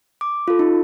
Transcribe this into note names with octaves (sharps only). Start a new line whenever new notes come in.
D6
F4 A4
D#4